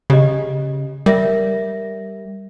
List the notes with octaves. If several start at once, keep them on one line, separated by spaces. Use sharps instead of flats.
C#3 G4 D#5
G3 A#4 E5 A#6